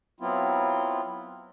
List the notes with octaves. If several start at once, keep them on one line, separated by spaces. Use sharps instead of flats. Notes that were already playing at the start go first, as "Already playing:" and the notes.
F#3 B3 C4 E4 F4